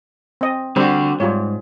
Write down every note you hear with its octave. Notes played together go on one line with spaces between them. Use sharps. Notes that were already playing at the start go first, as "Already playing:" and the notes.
C4 D#5
D3 G3 C4 F#4 C5
G#2 G3 F4 C#5